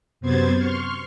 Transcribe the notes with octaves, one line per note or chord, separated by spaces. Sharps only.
F#2 C3 B3 C5 G#6 A6
C6 C#6 F6